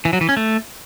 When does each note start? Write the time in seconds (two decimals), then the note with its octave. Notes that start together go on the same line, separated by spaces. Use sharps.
0.05 E3
0.13 F#3
0.21 E3
0.29 C#4
0.37 A3